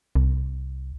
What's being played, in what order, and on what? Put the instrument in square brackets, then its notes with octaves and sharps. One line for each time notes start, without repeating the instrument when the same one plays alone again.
[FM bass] C2